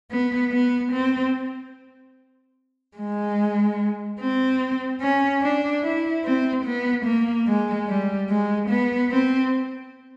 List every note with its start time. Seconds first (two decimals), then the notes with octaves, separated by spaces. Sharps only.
0.11 B3
0.52 B3
0.92 C4
2.97 G#3
4.19 C4
5.01 C#4
5.42 D4
5.83 E4
6.24 C4
6.65 B3
7.06 A#3
7.47 G#3
7.88 G3
8.29 G#3
8.69 B3
9.11 C4